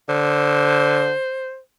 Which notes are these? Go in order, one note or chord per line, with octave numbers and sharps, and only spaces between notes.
D3 C5